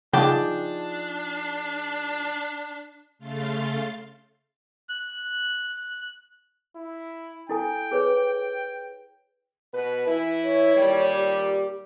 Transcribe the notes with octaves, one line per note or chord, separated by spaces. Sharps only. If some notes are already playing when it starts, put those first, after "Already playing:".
C#3 F3 D4 D#4 G#4 G5 A5 D6
C#3 A3 F5 C6 A6
F#6
E4
E4 A4 G5 G#5
G#4 B4 C#5
B2 B4
E3 E4
C#5
A#2 D#3 G3
G4